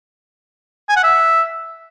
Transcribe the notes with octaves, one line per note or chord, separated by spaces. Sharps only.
G#5
F#5
E5